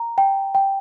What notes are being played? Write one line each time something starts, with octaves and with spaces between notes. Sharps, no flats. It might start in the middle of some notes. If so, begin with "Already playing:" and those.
Already playing: A#5
G5
G5